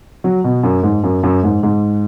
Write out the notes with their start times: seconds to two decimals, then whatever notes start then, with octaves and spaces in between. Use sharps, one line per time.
0.24 F#3
0.44 B2
0.63 F#2
0.83 G#2
1.04 F#2
1.23 F#2
1.43 G#2
1.63 G#2